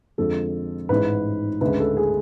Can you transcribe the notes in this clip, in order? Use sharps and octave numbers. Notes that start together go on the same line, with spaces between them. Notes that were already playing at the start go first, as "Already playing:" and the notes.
F2 D3 G#3 A4
A1 G#2 G#3 B4
D2 C#3 G#3 B4
A4
G#4